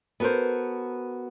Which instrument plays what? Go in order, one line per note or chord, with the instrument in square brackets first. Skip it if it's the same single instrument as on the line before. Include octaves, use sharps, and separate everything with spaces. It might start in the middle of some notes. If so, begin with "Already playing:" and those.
[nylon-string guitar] B3 F#4 A4 A#4 C5